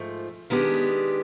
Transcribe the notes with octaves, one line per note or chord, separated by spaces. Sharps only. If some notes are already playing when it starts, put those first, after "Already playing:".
Already playing: G#2 F3 A3
D#3 G#3 B3 D4 G4